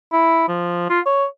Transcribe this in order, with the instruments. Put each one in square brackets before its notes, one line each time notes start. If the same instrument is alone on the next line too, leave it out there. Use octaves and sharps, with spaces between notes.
[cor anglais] E4
F3
F4
C#5